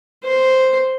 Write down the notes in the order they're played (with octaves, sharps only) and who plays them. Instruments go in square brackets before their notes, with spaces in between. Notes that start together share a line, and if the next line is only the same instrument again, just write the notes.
[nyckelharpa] C5